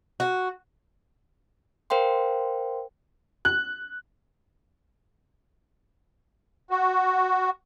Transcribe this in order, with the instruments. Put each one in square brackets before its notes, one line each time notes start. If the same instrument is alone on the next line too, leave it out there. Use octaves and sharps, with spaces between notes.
[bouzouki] F#4
[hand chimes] A#4 C5 F5 G5 C6
[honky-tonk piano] F#6
[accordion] F#4